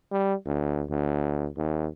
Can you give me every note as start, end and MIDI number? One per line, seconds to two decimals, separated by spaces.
0.12 0.34 55
0.46 0.83 38
0.90 1.48 38
1.57 1.87 39